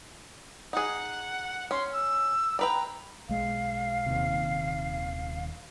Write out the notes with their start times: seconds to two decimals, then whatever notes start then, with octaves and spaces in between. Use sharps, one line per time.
0.73 D#4 G#4 F#5
1.71 C#4 C6
1.92 E6
2.59 D4 B4 G5 A#5
3.29 B1 G#3 F5
4.06 D#1 D#2 C3